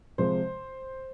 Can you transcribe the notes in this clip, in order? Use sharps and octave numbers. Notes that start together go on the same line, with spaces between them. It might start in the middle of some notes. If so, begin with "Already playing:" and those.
C3 F3 G#3 C5